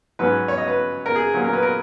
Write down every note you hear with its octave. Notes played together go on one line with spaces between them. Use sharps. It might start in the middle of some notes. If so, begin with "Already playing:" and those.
G#2 F#3 C#4 B4
C#5
D#5
B4
A#4
G#4
A#2 F#3 A#3 C#4
A#4
B4
A#4